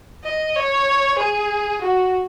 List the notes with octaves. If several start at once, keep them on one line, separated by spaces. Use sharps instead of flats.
D#5
C#5
G#4
F#4